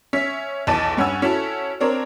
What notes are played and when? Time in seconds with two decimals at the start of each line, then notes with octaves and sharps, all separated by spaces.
0.13 C#4 E5 B6
0.67 B1 E2 A5 A6 D#7
0.97 G2 C#4 F#5 G#5 E6
1.22 C#4 E4 F#4 A4
1.81 C4 D4 A#4 C#5